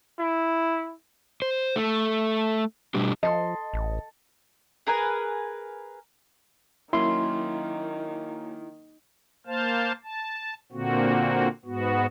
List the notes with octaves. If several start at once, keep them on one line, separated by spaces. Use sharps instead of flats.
E4
C5
A3
B2 G3 D4 G4
F3 A4 D#5 C6
A1
G#4 A#4 B4 G#5
D#3 F#3 A#3 C#4 E4 C6
A#3 C5 F5 A5
A5
A#2 D3 A#3 C4 F#4
G#2 B3 F#4